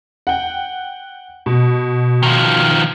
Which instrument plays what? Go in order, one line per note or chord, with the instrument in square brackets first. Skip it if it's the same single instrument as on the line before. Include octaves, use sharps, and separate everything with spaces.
[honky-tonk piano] F#5 G5
B2
[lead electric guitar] D#3 F3